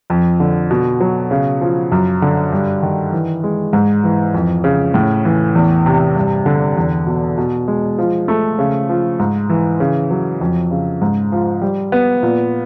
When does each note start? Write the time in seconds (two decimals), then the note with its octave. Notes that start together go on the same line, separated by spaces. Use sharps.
0.10 F2
0.40 D3
0.70 B2
1.01 F#3
1.31 C#3
1.61 F3
1.92 F#2
2.22 D3
2.53 G2
2.83 D#3
3.12 E3
3.44 G#3
3.73 G#2
4.04 E3
4.34 F2
4.64 C#3
4.94 A2
5.25 E3
5.55 E2
5.86 C3
6.16 G2
6.46 D3
6.77 E2
7.07 B2
7.38 B2
7.68 G#3
7.98 F3
8.28 A3
8.59 C#3
8.89 F3
9.19 G#2
9.50 E3
9.80 C#3
10.11 F#3
10.41 F2
10.71 C#3
11.01 G#2
11.32 F3
11.62 G3
11.92 B3
12.23 A#2